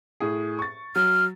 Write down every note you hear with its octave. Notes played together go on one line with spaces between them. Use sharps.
A2 G#4
C#6 A6
F#3 F6